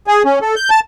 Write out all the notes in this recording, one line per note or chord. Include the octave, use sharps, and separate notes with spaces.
G#4
C#4
A4
G6
A5